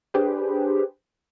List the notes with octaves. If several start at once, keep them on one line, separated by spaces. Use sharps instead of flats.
D4 G4 G#4 B4 C5